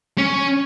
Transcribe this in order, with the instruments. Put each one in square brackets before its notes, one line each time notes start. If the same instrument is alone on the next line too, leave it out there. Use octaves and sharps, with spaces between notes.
[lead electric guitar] C#4